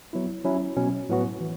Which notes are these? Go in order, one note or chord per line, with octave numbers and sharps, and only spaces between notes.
F#3 B3 E4
F#3 C#4 E4
B2 F#3 C#4
A2 F#3 B3 F#4
E3